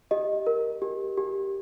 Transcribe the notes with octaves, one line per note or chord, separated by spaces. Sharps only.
G4 D#5
A#4
G4
G4